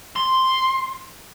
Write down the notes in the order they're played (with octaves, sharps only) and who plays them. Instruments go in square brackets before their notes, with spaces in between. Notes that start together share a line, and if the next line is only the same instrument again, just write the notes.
[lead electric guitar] C6